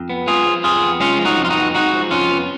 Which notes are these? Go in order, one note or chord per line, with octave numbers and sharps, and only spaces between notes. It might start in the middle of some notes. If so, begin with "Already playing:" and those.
Already playing: F2
B3
G#3 F4 G#4
F3
F2 F4 G#4
B3
G#3 C#4 F4
F3
D#4 F#4
F2
F4
D#4 F#4
B3
G#3 D#4 F#4
F3
F2 C#4 F4
B3